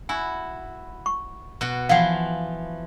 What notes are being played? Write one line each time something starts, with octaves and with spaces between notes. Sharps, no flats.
E4 F#4 G#5
C#6
B2 F#4
E3 F3 F5 F#5